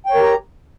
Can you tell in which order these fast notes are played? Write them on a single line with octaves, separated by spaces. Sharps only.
G5 C#5 A#4 G4 A#5